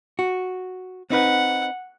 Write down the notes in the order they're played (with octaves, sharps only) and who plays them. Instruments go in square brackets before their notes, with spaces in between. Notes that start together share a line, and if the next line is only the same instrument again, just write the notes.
[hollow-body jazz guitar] F#4
[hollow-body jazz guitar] C4 D#4 B4 [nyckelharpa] F#5